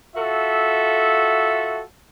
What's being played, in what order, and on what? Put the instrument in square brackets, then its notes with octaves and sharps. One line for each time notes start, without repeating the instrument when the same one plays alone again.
[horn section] F4 F#4 A4 E5